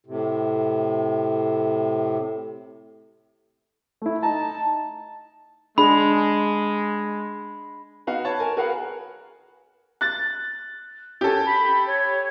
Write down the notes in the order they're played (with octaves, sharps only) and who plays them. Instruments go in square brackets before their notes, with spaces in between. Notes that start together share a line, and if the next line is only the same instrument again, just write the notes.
[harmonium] A2 C3
[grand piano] A3 E4
[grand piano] D#4 A#5 [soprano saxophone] A5
[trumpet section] G#3 [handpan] D4 G#4 [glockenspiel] B5
[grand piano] B3 D#4 F#4 F5
B4 C#5 A5
A#4 G#5
F#4 G#4 A#4 B4 F5 F#5
[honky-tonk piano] F#6 A6
[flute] C#4 [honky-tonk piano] G4 A4
[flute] B5
C#5